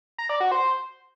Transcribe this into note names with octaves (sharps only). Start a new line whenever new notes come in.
A#5
D5
F#4
C5